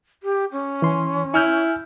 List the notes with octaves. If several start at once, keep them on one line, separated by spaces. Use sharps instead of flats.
G4
C#4
E3 C6
E4 G#5 F6 G6